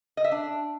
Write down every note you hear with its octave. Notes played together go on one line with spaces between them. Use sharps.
D#5
E5
D4